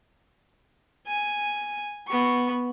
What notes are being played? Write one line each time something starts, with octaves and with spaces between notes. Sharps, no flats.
G#5
B3 C#6